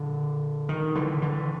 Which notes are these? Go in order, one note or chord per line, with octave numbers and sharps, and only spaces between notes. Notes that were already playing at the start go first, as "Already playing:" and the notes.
Already playing: A#2 D3
D#3
D3 E3
D3 E3